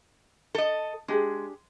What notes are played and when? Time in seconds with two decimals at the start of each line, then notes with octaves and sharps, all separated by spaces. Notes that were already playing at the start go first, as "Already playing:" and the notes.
0.55 A4 D#5
1.08 G#3 D4 G4 G#4